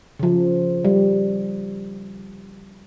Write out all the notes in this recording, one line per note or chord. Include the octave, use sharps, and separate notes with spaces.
C#3 F3
G3